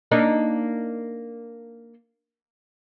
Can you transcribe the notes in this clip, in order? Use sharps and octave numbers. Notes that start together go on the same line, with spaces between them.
A#3 D4 D#4